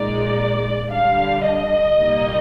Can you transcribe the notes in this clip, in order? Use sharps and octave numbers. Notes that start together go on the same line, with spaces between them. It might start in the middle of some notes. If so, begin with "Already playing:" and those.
Already playing: A#1 A#2 G#3 D#4 D5
F2 D3 G3 D4 F5
D#5
C2 A#2 G3 A#3 D#4